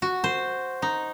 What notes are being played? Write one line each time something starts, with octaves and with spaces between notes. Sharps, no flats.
F#4
C5
D#4